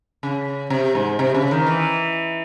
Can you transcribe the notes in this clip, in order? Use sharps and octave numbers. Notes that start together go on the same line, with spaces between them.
C#3
C3
G#2
C3
C#3
D#3
E3